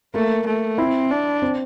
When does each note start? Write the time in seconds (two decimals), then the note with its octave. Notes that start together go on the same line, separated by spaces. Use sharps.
0.14 A3 A#3
0.46 A3
0.78 C4 E4
1.11 D4
1.42 C4